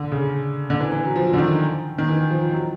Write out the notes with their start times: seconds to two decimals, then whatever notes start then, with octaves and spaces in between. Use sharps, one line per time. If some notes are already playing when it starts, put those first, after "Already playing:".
Already playing: D3
0.12 C#3
0.70 D3
0.80 E3
0.92 E3
1.05 F#3
1.16 F3
1.33 D3
1.38 D#3
1.98 D#3
2.08 E3
2.30 F3
2.53 F#3